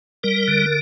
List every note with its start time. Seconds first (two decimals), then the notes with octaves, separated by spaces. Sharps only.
0.23 G3 A#4
0.48 D3